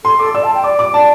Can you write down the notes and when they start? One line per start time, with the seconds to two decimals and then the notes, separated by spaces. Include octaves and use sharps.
0.04 A4 C6
0.19 A4 D6
0.34 D5 E6
0.44 A5
0.54 G5
0.64 D5 D6
0.79 D6
0.94 D5 A5